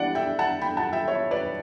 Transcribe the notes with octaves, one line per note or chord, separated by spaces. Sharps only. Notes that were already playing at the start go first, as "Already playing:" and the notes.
Already playing: E3 G3 D4 D5 F#5
E5 G5
F#5 A5
G5 B5
F#5 A5
E5 G5
C#5 E5
B4 D5